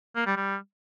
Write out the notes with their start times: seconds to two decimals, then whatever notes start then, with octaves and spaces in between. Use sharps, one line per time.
0.16 A#3
0.26 G3
0.37 G3